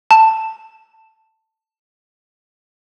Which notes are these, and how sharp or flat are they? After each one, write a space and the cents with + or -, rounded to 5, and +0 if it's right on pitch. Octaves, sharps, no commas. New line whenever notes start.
A5 +10